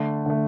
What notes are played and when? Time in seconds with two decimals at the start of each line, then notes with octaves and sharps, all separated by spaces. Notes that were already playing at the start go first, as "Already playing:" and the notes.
Already playing: D3 A3
0.26 D3 A3